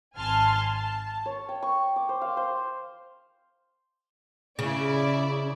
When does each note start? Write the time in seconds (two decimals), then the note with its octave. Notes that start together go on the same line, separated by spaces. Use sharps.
0.15 G#1 G#5 A5 C6 F6
0.71 A5
1.26 C#5
1.49 G5
1.63 C#6
1.96 D6
2.09 C5
2.22 F5
2.37 C5
4.59 C#3 E4 D5